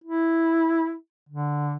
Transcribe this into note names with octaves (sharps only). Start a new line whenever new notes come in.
E4
D3